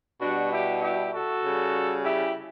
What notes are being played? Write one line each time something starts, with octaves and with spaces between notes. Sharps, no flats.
B2 G3 D4 F#4
E4 G4
E4 G4
F#4 A4
C#3 G3
E4 G4